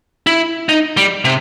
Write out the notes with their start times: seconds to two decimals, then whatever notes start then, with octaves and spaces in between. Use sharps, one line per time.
0.27 E4
0.69 D#4
0.97 G3
1.25 C3